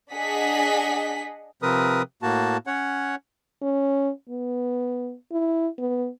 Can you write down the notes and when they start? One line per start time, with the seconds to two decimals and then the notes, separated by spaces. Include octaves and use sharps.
0.14 D4 G#4 D#5 F#5 B6
1.62 C3 F3 C4 A#4 B4 D#6
2.22 A2 A#3 F#4 A5
2.67 C#4 C#5 F#5
3.62 C#4
4.30 B3
5.32 E4
5.79 B3